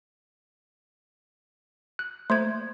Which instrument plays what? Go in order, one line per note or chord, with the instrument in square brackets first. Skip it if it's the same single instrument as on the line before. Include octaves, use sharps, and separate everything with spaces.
[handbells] F#6
[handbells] A3 A#3 C5 [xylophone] C6 G#6